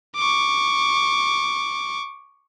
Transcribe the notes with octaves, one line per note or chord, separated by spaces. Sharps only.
C#6 D6